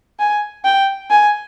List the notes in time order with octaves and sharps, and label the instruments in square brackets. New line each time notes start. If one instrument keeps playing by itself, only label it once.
[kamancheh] G#5
G5
G#5